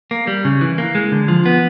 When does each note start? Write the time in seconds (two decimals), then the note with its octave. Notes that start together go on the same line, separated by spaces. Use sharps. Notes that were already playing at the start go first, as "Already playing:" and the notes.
0.11 A#3
0.27 G3
0.45 C#3
0.61 E3
0.78 A#3
0.95 G#3
1.12 D3
1.28 F3
1.46 B3